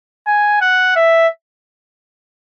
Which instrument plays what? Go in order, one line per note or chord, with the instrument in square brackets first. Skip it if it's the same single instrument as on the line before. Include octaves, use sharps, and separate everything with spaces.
[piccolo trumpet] G#5
F#5
E5